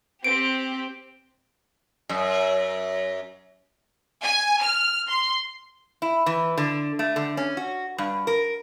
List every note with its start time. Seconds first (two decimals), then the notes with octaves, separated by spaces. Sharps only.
0.24 C4 G4 D7
2.09 F#2
4.22 G#5
4.60 F6
5.08 C6
6.02 E4
6.26 E3
6.58 D3
6.99 A3
7.16 D3
7.37 C#4
7.57 F#4
7.98 G2
8.27 A#4